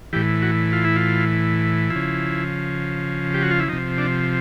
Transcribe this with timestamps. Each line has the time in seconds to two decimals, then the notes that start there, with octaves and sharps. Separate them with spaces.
0.13 A2 E3 G4
0.42 F#4
0.73 F4
0.84 E4
0.96 F4
1.90 F3 E4
1.96 C#3
3.34 G4
3.42 F#4
3.51 F4
3.60 E4
3.68 C3 F3 D#4
3.98 D4